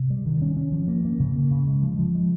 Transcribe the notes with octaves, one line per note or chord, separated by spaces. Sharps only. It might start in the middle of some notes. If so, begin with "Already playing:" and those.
Already playing: C3
G3
D#3
C#4
C#4
F3
A#3
A#3
C#3
A#3
C#3
G#3
F3
F3
G#3